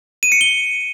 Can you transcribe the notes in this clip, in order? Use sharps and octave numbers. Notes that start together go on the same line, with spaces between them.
D#7
C#7
G7